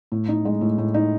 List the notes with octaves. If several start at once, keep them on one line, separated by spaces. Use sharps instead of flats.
A2
D#4
G#3
A2
A2
D#4